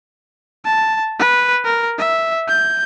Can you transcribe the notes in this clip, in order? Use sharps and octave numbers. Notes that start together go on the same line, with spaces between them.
A5
B4
A#4
E5
G6